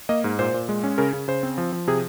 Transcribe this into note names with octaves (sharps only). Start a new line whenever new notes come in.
A#3 D#5
G#2
A#2 C5
A#2
G#3
C#4
C#3 A#4
C#3
C#3 C5
C4
F3
F3
C3 G#4